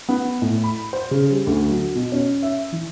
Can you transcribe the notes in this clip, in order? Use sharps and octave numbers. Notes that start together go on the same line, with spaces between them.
B3
A2
B5
C5
C#3
G3
D2
F#3
B2
C#4
E5
E3